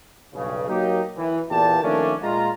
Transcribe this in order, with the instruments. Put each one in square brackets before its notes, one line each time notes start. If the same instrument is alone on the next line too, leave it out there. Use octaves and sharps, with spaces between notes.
[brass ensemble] B1 G2 C#3
F#3 A#3 D#4 G4
E3
E2 A#2 G4 A5
D#3 F3 A3 A#3 C#4 D4
A#2 G#3 F4 A#5